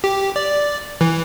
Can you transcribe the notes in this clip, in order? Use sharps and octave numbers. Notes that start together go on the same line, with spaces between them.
G4
D5
E3